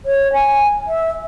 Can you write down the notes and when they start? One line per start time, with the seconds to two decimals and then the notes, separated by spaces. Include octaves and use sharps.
0.06 C#5
0.33 G#5
0.87 E5